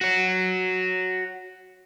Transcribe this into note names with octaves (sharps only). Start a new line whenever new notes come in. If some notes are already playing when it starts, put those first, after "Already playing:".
F#4 C#5